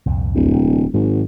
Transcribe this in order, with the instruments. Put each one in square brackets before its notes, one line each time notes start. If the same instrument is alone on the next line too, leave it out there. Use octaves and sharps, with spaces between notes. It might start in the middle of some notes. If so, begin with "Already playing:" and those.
[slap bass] C2 F2 A#2
[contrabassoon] D1
[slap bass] E1
[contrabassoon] G#1 [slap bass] G#2 D#3 F#3